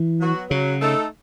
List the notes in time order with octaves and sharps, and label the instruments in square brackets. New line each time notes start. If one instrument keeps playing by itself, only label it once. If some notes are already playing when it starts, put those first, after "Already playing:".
Already playing: [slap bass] E3
[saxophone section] F#3 B3 F#4
[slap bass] C#3 [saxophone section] F#3
[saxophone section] A3 D#4 A4